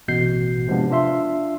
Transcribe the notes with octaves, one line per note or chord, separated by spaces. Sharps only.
A1 B2 G6 C7
C3 F3 G#3 B3 D4
D4 F4 E5 C6